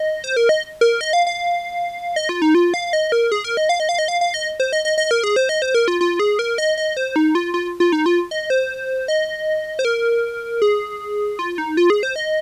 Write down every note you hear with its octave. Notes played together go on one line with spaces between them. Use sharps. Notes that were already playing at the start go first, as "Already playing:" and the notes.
Already playing: D#5
C5
A#4
D#5
A#4
D#5
F5
F5
D#5
F4
D#4
F4
F5
D#5
A#4
G#4
A#4
D#5
F5
D#5
F5
D#5
F5
F5
D#5
C5
D#5
D#5
D#5
A#4
G#4
C5
D#5
C5
A#4
F4
F4
G#4
A#4
D#5
D#5
C5
D#4
F4
F4
F4
D#4
F4
D#5
C5
D#5
C5
A#4
G#4
F4
D#4
F4
G#4
C5
D#5